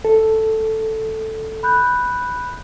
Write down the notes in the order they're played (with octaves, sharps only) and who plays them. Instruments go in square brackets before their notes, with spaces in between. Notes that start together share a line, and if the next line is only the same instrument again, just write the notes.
[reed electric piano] A4
[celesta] B5 F#6 G6